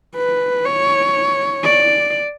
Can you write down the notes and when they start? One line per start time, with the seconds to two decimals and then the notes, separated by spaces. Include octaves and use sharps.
0.16 B4
0.65 C#5
1.64 D5